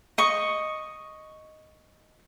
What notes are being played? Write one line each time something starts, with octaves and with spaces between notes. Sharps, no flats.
D#5 C#6